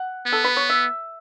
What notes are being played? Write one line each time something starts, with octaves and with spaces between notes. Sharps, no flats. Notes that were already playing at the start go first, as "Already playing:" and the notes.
Already playing: F#5
B3
A4
B4
C#5
E5